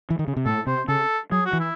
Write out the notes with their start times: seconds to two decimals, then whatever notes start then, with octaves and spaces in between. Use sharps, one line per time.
0.10 E3
0.19 D#3
0.28 C#3
0.37 C3
0.46 A2 A4
0.67 C3 C5
0.88 C#3 A4
1.32 F#3 G#4
1.46 F#4
1.53 E3
1.60 E4